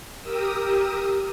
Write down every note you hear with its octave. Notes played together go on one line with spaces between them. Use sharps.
G4 A#4 D#6 E6